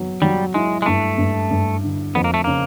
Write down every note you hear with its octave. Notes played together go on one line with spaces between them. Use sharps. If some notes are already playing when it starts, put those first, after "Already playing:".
Already playing: F#3 B3
F#3 G3
G#3 E4
G#3
G2 A3
G2
G2
D3
F2 B3
A#3
A3
C#3 A#3